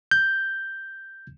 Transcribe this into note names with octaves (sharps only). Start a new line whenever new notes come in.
G6